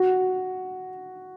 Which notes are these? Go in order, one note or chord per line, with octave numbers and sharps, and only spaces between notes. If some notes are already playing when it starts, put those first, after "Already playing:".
Already playing: F#4